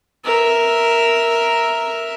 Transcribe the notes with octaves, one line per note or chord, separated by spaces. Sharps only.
A#4 E5